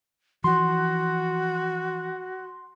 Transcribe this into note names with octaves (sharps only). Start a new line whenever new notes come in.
E3 F3 F#4 C6